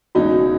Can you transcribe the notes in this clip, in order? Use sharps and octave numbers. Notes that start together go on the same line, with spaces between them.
E1 E2 C#3 G#3 D#4 F#4